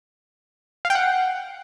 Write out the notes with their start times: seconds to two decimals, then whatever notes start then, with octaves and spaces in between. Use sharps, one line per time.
0.85 F5
0.90 G5
0.95 F#5